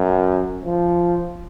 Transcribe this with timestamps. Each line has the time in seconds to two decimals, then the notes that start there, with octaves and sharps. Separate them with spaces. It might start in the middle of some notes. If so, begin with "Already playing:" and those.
Already playing: F#2
0.64 F3